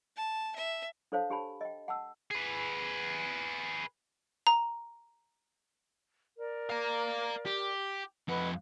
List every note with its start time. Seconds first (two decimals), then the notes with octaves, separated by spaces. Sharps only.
0.16 A5
0.56 E5
1.12 D4 A4 C5 C#5 F5 A5
1.30 D4 G4 G#5 A5 B5
1.61 D#5 G5
1.88 F#5 A5 E6
2.31 G#4 B4
4.47 A#5
6.38 A#4 D5
6.70 F5 A#5
7.46 G4
8.28 F2 B4 D#5 F#5